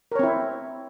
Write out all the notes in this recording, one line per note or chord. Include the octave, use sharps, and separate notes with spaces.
C4 E4 A#4 C#5